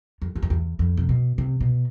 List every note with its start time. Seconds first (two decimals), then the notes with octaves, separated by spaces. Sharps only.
0.22 F2
0.35 F#2
0.43 F2
0.50 E2
0.79 F2
0.97 C3
1.09 B2
1.38 C3
1.61 B2